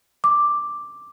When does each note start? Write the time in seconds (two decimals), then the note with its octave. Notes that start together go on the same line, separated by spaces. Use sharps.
0.24 D6